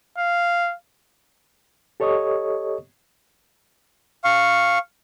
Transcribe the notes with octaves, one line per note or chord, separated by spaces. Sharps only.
F5
G4 A4 C#5 D#5 C#6 D#6
F5 C#6